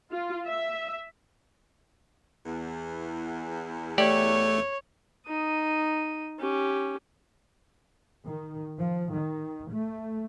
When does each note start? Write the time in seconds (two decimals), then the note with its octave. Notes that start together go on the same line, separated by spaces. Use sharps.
0.11 F4
0.47 E5
2.46 E2
3.98 A3 G4 C#5 D5
5.27 D#4 D#6
6.40 C#4 G4
8.25 D#3
8.79 F3
9.13 D#3
9.70 A3